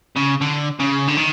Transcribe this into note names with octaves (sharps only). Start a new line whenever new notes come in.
C#3
D3
C#3
D3
D#3